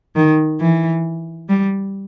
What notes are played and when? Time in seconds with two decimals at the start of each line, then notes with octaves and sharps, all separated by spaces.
0.16 D#3
0.60 E3
1.49 G3